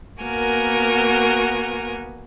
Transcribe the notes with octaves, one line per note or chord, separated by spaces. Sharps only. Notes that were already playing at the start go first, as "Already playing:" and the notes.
A#3 B3 F#4 A#4 G#5